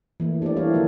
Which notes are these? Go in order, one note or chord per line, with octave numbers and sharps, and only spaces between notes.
E3 A3 A#3
D4 G4 A4 C5 D5
G3 E4 A4 C#5 D5 F5
D3 F3 A#3 F#4 A#4